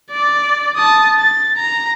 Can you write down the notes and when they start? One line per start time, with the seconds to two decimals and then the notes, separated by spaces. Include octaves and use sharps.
0.11 D5
0.76 A5 D#6
1.19 A6
1.57 A#5